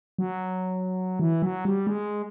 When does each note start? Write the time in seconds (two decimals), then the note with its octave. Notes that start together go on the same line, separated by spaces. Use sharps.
0.19 F#3
1.20 E3
1.42 F#3
1.65 G3
1.87 G#3